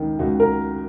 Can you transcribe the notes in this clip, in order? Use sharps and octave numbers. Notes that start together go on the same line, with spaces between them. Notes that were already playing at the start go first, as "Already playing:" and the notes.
Already playing: C#2 D#3
C#2 F#4
A#4